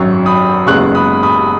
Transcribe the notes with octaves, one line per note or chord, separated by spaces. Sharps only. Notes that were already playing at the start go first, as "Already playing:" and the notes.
Already playing: G#1 F#2 F#3 C#6
B5 D#6
F#1 F#2 C#3 G#3 B3 C#6 F#6
B5 D#6
B5 D#6